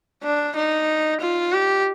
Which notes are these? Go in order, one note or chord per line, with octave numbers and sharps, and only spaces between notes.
D4
D#4
F4
G4